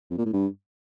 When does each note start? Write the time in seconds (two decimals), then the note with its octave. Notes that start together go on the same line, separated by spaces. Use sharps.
0.10 F2
0.18 A#2
0.25 A2
0.33 G2